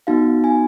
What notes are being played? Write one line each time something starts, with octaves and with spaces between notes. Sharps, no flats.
B3 D#4 F#4 F5
G#5